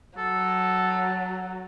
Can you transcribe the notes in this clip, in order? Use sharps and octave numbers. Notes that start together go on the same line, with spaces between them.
F#3 A4